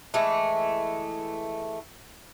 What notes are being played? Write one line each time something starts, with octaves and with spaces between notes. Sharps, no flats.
E3 G#3 A3